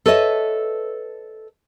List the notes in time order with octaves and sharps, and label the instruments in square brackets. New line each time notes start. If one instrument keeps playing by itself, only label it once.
[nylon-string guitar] A4 B4 C#5 D#5 E5